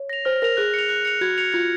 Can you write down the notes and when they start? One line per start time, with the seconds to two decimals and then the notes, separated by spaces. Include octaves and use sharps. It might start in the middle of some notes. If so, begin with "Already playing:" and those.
Already playing: C#5
0.09 A#6 F7
0.25 C5 F6
0.42 A#4 A#6 F7
0.57 G#4 F#6
0.74 C#7 F7
0.89 F#6
1.05 C#7 F7
1.21 F#4 G#6
1.38 C#7 F7
1.53 F4 G#6